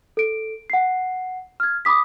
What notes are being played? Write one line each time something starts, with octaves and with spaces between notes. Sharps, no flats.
A4 D7
F#5 C7
F6 G#6
B5 D6 D#6 B6